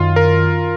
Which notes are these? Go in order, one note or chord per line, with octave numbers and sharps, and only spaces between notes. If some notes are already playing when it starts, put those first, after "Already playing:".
Already playing: F#2 D#3 F4
A#4